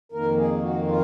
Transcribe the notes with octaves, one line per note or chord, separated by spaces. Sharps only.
F2 D#3 A#3 A#4
G#4
F#4
F4